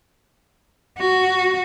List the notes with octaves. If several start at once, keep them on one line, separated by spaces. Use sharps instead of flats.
F#4